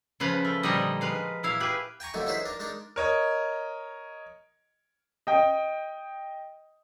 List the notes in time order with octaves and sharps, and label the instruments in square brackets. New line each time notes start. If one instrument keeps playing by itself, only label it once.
[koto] C#3 F3 B4 F5
A3
A#2 D3 F3 G3 D#4 D#5
G#3 B4 F5
A#2 E4 F5
G4 G#4 B4
[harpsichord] G5 G#5 A#5 C#6
D#2 D3 F#3 A3 D#4
C#4 D#4 E4 G#4 B4 C5
D4 A#4
G#3 D4 D#4 A#4
[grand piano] A#4 C#5 D#5
D#5 G5